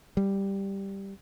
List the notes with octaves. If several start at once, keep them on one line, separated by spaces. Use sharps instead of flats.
G3